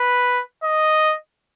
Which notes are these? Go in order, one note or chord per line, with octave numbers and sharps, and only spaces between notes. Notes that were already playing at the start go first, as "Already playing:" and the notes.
Already playing: B4
D#5